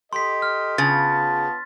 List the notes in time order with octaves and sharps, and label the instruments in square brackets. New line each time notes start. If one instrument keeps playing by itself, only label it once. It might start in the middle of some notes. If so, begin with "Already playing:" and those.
[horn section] G4 A4 D#5 [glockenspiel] C6 B6
[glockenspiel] F6
[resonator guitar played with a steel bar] C#3 [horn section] B3 F4 A5 [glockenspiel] A6